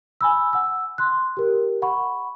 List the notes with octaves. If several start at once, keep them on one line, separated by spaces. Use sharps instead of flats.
G#5 B5 E6
F#5 E6
C6 F#6
G4 A#4
F#5 B5 C#6